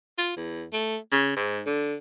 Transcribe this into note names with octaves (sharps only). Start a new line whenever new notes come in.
F4
E2
A3
C#3
G#2
D3